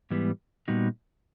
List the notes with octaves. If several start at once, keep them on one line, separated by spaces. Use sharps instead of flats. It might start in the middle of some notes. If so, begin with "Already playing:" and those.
G#2 E3 G3 B3
A#2 G3 B3 D#4 F#4